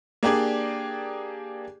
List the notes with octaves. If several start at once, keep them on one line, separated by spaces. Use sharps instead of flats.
A#3 D4 G4 G#4 D5